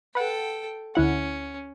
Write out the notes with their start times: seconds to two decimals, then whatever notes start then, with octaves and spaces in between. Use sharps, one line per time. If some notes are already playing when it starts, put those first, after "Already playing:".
0.15 A4 B4 F#5 G5
0.95 D2 C#4 E4 F#5